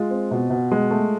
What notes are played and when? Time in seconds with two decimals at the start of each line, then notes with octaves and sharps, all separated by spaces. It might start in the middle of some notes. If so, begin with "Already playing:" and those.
Already playing: G#3 F4
0.11 C4
0.31 B2
0.50 B2
0.72 G#3
0.91 A3